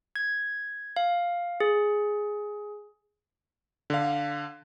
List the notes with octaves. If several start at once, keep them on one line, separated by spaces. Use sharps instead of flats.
G#6
F5
G#4
D3 F5